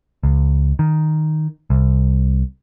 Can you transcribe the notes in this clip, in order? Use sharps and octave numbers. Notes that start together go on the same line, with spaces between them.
C#2
D#3
C2